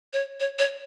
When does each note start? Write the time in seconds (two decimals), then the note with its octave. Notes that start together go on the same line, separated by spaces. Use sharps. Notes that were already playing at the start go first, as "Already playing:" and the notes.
0.13 C#5
0.40 C#5
0.59 C#5